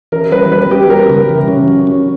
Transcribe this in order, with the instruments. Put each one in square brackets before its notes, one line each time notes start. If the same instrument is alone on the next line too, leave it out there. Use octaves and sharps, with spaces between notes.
[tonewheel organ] E3 [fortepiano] A#4
[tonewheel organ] G3 [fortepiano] B4
[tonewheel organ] G3 [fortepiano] B4
[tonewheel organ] G3 [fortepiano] G4
[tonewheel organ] G3 [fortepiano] A#4
[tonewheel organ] C#3
E3
C#4
F#3
C#4